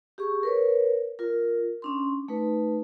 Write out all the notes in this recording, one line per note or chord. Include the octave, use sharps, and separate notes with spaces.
G4 G#4 C#6
A#4 B4 C#5
F4 A#4
C#4 D4 C6
A3 D#4 B4